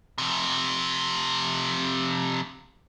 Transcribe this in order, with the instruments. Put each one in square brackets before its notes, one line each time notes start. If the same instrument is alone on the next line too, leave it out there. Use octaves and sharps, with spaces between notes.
[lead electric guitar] F2 C3